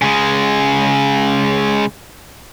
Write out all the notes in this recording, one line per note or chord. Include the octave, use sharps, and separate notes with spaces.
C#3 G#3